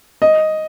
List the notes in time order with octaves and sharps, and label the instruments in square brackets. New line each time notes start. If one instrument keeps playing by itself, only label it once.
[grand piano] D#5